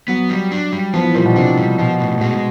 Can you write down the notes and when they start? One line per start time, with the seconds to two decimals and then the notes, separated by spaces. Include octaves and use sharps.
0.08 F#3 B3
0.30 G3
0.52 D4
0.73 G3
0.94 F3 B3
1.04 E3
1.15 A#2 G3
1.25 B2
1.36 C3 D4
1.58 G3
1.79 B2 F3
2.00 A2
2.21 B2 G#3